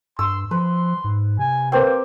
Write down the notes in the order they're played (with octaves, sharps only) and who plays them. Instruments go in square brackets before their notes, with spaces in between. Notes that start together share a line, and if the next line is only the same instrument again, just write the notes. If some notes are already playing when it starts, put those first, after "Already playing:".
[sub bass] G2 [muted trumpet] C6 [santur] E6
[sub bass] F3 [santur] B4 [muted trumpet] C6
[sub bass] G#2
[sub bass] C3 [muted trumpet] G#5
[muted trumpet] A#3 [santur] C4 G4 [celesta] A#4 B4 G5